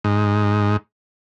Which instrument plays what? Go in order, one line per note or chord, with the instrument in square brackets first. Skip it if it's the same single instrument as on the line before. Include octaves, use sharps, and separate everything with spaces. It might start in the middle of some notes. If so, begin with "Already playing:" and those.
[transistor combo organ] G#2